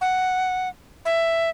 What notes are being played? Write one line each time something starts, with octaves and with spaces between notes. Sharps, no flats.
F#5
E5